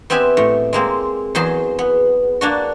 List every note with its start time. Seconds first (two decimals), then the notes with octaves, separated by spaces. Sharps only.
0.10 B3 C4 G4 E5 G#5
0.37 A2
0.73 G#3 A#3 C4
1.35 E2 F#3 G#4 C5 C6
1.79 B3
2.41 A#3 D4 F#4